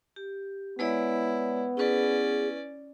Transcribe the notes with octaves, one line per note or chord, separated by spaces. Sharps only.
G4
G#3 B3 E4 C#5 D5
C#4 E4 G#4 B4 D5